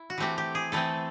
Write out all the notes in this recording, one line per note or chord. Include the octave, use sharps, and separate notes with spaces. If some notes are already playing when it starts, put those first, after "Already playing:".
Already playing: E4
F#4
E3 A3 C4 G4
G4
G#4
E3 A3 C4 A4